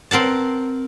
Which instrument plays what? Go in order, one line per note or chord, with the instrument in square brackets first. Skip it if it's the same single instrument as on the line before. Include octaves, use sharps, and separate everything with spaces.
[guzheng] C4 A#4 F#5 A5